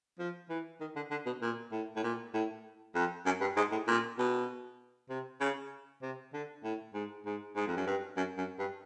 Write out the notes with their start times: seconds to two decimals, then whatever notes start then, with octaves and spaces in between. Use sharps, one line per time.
0.19 F3
0.49 E3
0.81 D#3
0.96 D3
1.11 D3
1.26 B2
1.42 A#2
1.72 A2
1.96 A2
2.04 A#2
2.34 A2
2.95 F2
3.26 F#2
3.41 G2
3.56 G#2
3.72 A2
3.87 A#2
4.18 B2
5.10 C3
5.41 C#3
6.02 C3
6.33 D3
6.64 A2
6.94 G#2
7.26 G#2
7.56 G#2
7.67 F2
7.77 F#2
7.87 G2
8.17 F#2
8.38 F#2
8.59 G2